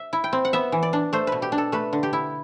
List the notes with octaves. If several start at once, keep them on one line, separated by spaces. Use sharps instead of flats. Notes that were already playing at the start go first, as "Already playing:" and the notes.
Already playing: E5
E4
G5
C4
F#5
B3 E5
E3
D5
D4
A3 C5
B2 B4
G4
D4
A4
A3 B4
D3
G4
E4